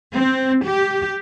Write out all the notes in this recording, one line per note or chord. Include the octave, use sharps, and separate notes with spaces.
C4
G4